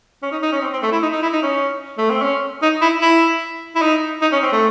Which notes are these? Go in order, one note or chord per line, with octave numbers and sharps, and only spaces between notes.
C#4
D#4
D#4
C#4
C4
C4
A3
E4
D#4
D#4
E4
D#4
C#4
A3
C4
C#4
D#4
E4
E4
E4
D#4
D#4
C#4
C4
A3